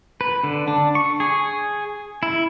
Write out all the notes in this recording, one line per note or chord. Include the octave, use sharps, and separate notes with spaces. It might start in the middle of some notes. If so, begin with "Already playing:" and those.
B4
D3
D4
C#6
G#4
E4